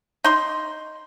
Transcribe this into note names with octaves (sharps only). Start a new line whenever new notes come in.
D#4 C6